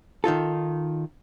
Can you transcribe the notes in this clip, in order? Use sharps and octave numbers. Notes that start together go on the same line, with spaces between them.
D#3 D#4 F4 A4